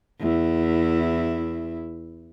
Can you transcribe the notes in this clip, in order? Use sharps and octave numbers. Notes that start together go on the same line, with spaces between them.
E2 E4